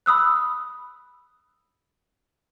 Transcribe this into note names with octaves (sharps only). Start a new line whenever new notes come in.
B5 D#6 E6 F#6